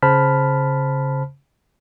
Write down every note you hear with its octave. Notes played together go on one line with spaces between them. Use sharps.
C#3 C5 A5 B5 F6 B6